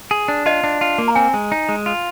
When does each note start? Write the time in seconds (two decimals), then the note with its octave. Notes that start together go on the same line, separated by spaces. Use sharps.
0.11 G#4
0.28 D4
0.46 F4 D#5
0.64 D4
0.81 F4
0.98 A#3
1.08 A#5
1.15 C4 G#5
1.34 G#3
1.52 D#4
1.69 G#3
1.86 F4